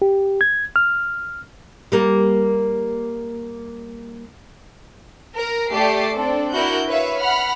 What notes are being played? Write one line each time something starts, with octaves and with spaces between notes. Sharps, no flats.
G4
G#6
F6
G3 A#3
A#4
A3 G4 D5 A5 D6 C7
C4 D4 A4
D4 E4 F#4 A#4 F#6 G6
B4 C#5 E5 F5
F#5 B5 F6